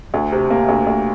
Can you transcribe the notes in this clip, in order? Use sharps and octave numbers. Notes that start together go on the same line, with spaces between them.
D2
C3
A#3
D2
D2